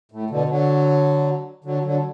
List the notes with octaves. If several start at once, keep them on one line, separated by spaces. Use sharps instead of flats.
A2
B2 D3
D3 F#3
D3 F#3
D3 F#3